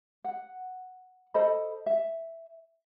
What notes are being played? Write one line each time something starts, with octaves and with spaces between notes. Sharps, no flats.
F#5
A4 C5 D#5 B5
E5